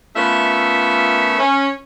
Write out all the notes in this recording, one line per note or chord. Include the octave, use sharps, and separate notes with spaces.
A3 B3 C#4 F4 A#4 E5
C#4